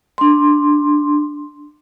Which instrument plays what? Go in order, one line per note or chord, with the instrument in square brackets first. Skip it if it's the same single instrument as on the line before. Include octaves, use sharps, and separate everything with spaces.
[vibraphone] D4 C6